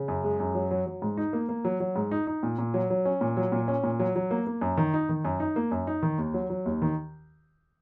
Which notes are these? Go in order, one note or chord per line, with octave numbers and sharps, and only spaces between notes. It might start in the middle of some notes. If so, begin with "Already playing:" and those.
Already playing: C#3
F#2
G#3
F#2
F#3
F#3
F#3
G#2
D#4
A#3
A#3
F#3
F#3
G#2
D#4
D#4
A#2
A#2
F#3
F#3
C#4
A#2
F#3
A#2
C#4
A#2
F#3
F#3
A#3
A#3
F#2
D#3
D#4
D#3
F#2
D#4
A#3
F#2
D#4
D#3
D#2
F#3
F#3
D#2
D#3